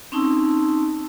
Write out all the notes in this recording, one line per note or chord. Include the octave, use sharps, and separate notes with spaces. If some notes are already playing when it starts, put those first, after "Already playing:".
C4 C#4 D#4 A5 C6 E6